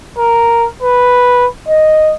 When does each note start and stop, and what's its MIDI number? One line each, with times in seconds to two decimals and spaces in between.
0.18 0.67 70
0.82 1.45 71
1.68 2.13 75